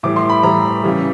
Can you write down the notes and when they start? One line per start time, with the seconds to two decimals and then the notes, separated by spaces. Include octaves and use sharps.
0.03 A2 E3 G3 D6
0.16 C6
0.29 B5
0.43 A2 E3 G3 A#5
0.84 C#3 E3 G3